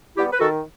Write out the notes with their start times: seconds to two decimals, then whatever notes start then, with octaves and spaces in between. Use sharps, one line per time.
0.16 G3 B3 E4 G4
0.31 B4
0.39 D#3 F#4 A4